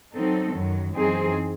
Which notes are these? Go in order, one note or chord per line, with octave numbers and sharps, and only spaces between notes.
F#3 C4 D#4 A4
F#2 D#3 F#3
F#2 E3 C4 D#4 G#4